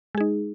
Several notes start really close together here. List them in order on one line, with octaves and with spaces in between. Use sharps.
G#3 G#4 D#4